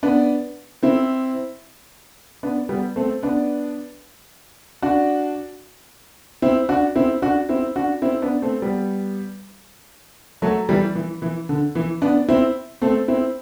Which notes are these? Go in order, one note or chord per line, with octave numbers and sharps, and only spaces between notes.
B3 D4
C4 E4
B3 D4
G3 B3
A3 C4
B3 D4
D4 F#4
C4 E4
D4 F#4
C4 E4
D4 F#4
C4 E4
D4 F#4
C4 E4
B3 D4
A3 C4
G3 B3
F#3 A3
E3 G3
E3
E3
D3
E3
B3 D4
C4 E4
A3 C4
C4 E4